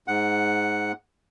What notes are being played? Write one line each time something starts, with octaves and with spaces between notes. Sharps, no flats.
G#2 F#5